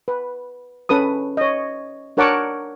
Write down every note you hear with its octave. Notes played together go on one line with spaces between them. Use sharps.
B4
C#4 A4 B4 D#6
C#5 D#5
D4 A#4 C#5 F#5 A5 D6